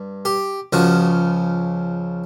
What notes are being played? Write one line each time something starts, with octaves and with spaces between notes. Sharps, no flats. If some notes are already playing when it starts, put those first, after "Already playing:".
Already playing: G2
G4
C#2 C#3 F3 F#4